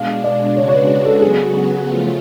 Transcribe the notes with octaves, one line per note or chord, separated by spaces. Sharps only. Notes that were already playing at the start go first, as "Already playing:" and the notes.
Already playing: B2 G#3 D4 F5
D5
C#3 G#3 D4 F#4 C#5
C#5
B4
A4
C#3 F#3 B3 F#4 G#4
C#3 F3 A3 F4